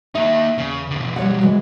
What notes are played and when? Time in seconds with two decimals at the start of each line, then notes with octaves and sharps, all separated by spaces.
0.15 A#3 D#4 E5
0.58 E2 C#3
0.91 B2 D3
1.16 G3 C#5 F#5
1.41 E3 G#3 F#4